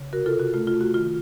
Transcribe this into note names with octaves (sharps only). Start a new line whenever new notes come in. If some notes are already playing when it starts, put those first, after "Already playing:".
Already playing: C#3
C3 F#4 A#4
F4 A4
C3
F#4
A3 F4
F4
A3
F#4
D#3 F4